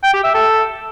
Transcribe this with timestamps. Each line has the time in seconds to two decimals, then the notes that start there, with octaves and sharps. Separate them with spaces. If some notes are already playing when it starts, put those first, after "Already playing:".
0.04 G5
0.14 G4
0.24 E5
0.34 A4